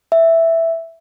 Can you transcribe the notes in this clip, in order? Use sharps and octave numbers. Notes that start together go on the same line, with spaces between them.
E5